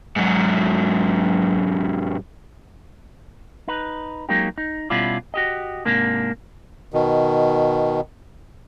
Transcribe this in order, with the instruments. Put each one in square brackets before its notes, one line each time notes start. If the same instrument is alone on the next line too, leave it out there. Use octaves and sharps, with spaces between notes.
[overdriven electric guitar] G#2 F#3
[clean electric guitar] D#4 B4
F#3 G#3 A#3 C#4 D#4 G4
D#4
B2 G3 C#4 E4 F4 D5
F#4 G4 D#5
G#2 C3 A#3 D4
[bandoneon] B2 D#3